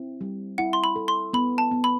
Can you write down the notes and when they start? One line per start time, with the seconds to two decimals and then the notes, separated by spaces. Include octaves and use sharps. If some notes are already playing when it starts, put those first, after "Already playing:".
Already playing: C4 E4
0.21 G3
0.58 E4 F#5
0.73 C6
0.84 B5
0.96 A4
1.08 C6
1.33 B3 B5
1.58 A5
1.71 B3
1.84 B5